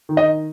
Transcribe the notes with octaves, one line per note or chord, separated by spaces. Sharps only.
D#3
D#5